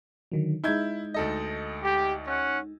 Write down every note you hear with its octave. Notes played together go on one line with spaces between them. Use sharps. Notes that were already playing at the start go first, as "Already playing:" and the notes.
D3 D#3 F#3
G#3 D#4 E4 G6 G#6
D2 A4 D#5
G4
C#4 F#5